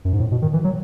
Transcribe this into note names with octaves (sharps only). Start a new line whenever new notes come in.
F#2
G#2
A2
B2
D#3
E3
F#3